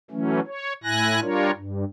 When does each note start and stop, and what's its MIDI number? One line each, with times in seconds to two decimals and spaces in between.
0.11 0.40 52
0.11 0.40 54
0.11 0.40 57
0.11 0.40 61
0.47 0.73 73
0.83 1.20 45
0.83 1.20 64
0.83 1.20 80
0.83 1.20 90
0.83 1.20 94
1.21 1.51 55
1.21 1.51 62
1.21 1.51 65
1.21 1.51 70
1.21 1.51 73
1.54 1.84 43